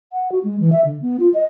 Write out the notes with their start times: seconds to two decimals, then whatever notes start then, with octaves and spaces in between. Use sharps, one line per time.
0.13 F#5
0.32 F#4
0.44 G#3
0.60 E3
0.72 E5
0.85 D3
1.02 B3
1.20 F4
1.34 D#5